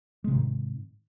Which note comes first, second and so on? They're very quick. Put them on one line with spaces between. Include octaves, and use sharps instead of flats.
G#3 C3 D#3 G#2